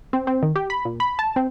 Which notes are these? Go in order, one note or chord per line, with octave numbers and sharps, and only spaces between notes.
C4
C4
D#3
G4
B5
A#2
B5
A5
C4